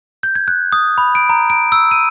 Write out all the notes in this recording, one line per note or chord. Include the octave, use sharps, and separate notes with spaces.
G6
G#6
F#6
D#6
B5
D7
A#5
D7
E6
D#7